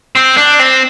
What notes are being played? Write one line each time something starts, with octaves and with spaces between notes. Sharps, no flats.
C4
D4
C4